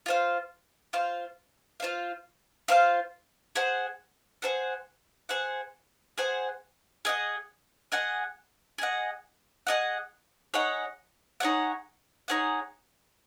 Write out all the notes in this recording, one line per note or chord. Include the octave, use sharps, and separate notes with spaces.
F4 C5 F5
F4 C5 F5
F4 C5 F5
F4 C5 F5
G#4 C5 F#5
G#4 C5 F#5
G#4 C5 F#5
G#4 C5 F#5
G#4 D#5 F#5
G#4 D#5 F#5
G#4 D#5 F#5
G#4 D#5 F#5
D#4 G#4 C#5 F#5
D#4 G#4 C#5 F#5
D#4 G#4 C#5 F#5